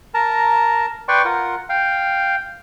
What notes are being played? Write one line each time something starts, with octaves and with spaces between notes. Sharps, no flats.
A#4 A5 A#5
B4 D5 G5 C6 C#6
F4 A#4 F#5
F5 G5